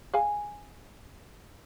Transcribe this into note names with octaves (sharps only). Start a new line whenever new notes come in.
G#4 F5 G#5